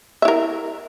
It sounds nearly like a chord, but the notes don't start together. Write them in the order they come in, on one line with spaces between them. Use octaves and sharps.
E5 E4 A#4